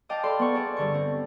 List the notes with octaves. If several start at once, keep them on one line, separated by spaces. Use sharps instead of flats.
D#5 F5 G5 A5 D6 D#6
A4 D5 B5 C6
B3 C#6
G#4 A4 D5
G2 D3 C#6
C4